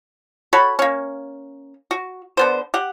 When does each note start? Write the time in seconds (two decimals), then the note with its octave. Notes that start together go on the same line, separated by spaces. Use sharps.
0.53 F#4 A4 C#5 B5
0.79 A#3 C#4
1.91 F#4
2.37 D3 B3 C5
2.74 G4 F#5